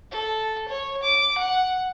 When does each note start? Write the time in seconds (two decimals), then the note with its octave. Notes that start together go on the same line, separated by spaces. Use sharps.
0.11 A4
0.68 C#5
1.02 D6
1.38 F#5